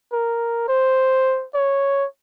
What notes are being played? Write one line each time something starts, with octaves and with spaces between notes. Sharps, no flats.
A#4
C5
C#5